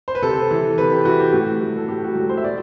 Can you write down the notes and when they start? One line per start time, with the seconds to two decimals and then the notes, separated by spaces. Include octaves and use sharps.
0.08 C5
0.15 B4
0.22 C3 A4
0.51 E3
0.78 C3 B4
0.92 G4
1.05 E3 F#4
1.20 G4
1.33 A2 F#4
1.61 F#3
1.77 A4
1.88 A2 G4
2.04 F#4
2.15 F#3 G4
2.29 C5
2.37 E5
2.43 B2 D5